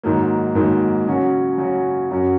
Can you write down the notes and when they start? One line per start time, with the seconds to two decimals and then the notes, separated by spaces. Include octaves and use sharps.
0.03 G#2 D#3 F#3 A#3
0.55 G#2 D#3 F#3 A#3
1.06 C#3 F#3 C#4 F#4
1.58 C#3 F#3 C#4 F#4
2.10 F#2 F#3 C#4 F#4